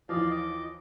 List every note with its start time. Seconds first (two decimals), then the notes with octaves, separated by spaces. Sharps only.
0.09 D#2 E3 F3 D5 D#5 F5
0.30 D#5 D6